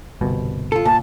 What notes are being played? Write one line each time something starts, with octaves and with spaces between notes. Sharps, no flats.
G1 C2 B2
F4 A4
A#2 A5